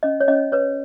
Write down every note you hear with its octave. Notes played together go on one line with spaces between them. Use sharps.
C#4 D#5
C#5
C#4 D#5
B4 C#5